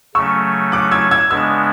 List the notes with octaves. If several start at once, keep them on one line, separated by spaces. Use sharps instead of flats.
C#3 F#3 A3 C#4 C#6 E6
D6 F#6
E6 G#6
E6 G#6
C#3 G#3 B3 D4 E6 G#6